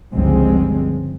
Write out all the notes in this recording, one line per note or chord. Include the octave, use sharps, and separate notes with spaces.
G1 C#2 F3 G#3 C4